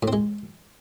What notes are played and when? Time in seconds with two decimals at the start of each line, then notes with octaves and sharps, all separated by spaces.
0.03 A2
0.08 C4
0.13 G#3